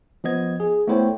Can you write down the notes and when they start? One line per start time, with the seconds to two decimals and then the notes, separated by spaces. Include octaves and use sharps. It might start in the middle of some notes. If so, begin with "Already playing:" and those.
0.24 F3 B3 D#5 G#6
0.60 G#4
0.87 A3 B3 E4 C5 C#5 G5